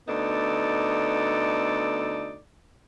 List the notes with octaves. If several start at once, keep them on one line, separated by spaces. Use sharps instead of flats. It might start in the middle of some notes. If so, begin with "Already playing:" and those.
D2 B3 D#4 A4 D5